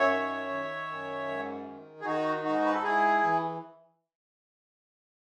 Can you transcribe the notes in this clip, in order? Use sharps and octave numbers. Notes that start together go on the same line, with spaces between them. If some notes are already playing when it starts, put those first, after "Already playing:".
Already playing: F#2 C#5 E5
D#3
D#3
F#2
G#2
D#3
G#4
D#3 D#4 F#4
G#2 D#4 F#4
B4
A4
G#2 E4 G#4
E3